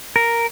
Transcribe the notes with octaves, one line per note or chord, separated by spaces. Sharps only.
A#4